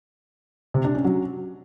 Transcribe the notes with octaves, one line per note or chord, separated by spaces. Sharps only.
C3
D4
C#4
F#3